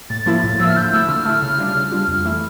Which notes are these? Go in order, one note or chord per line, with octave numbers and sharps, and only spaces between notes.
A2 A6
F3 A#3 E4
A2
F3 A#3 E4 E6
F6
D3 G6
A3 E4 E6
D3 F6
A3 E4
C#3
G3 D4 F4
C#3
G3 D4 F4
F2
E3 A3 E4